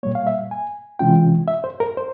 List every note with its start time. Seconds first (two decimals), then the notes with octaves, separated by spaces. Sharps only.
0.03 A#2 G3 A#3 C#5
0.15 F5
0.27 E5
0.51 G#5
0.99 C3 E3 G#3 C#4 F4 G5
1.48 E5
1.64 C5
1.80 A#4
1.97 C5